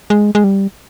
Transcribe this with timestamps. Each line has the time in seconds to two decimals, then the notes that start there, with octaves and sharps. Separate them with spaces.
0.10 G#3
0.35 G#3
0.44 G3